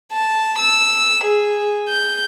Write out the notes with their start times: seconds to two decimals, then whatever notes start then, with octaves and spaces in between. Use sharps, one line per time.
0.12 A5
0.59 E6
1.24 G#4
1.89 G6